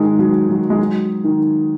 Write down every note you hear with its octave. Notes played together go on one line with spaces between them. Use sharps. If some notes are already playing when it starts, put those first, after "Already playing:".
Already playing: D#3 G#3
F#3
F#3
G#3
F#3
D#3